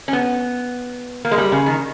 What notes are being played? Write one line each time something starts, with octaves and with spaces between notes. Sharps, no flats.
C#4
B3
A#3
G#3
G3
C#3
D#3